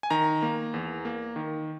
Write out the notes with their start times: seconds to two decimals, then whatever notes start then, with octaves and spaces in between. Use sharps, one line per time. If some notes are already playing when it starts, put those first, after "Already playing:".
0.03 G#5
0.10 D#3 A#5
0.42 A#3
0.74 E2
1.05 A#3
1.36 D#3